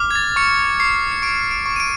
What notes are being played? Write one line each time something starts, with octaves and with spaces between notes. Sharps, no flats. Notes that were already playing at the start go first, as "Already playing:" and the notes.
Already playing: D6 F6
G#6
A6
C#6 C#7
C#6 C7
C#7
C#6 D7
D7
C#6
D#7
D7